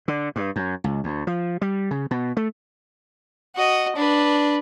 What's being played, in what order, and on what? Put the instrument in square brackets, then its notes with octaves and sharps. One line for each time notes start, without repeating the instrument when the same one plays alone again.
[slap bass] D3
G2
F#2
C#2
D2
F3
G3
C#3
B2
A3
[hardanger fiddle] F#4 D#5
D4 B4